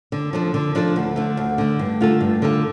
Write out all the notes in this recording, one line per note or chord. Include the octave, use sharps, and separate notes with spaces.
D3
F3 D4 A4
D3
F3 D4 A4
D2
D3 A3
D2
D3 A3
G2
D3 A3 F4 A4
G2
D3 A3 F4 A4